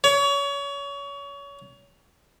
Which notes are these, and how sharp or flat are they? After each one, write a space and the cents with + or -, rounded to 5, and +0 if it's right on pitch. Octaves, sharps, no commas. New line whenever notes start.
C#5 +30